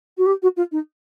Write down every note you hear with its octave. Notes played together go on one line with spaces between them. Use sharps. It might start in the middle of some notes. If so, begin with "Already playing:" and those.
F#4
G4
F#4
F4
D#4